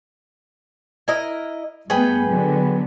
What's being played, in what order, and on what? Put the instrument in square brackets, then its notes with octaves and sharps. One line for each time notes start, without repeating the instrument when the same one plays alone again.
[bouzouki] E4 A#4 D#5
[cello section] G2 A3 B3 [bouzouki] G#4 B4 G5
[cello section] D3 F#3 B3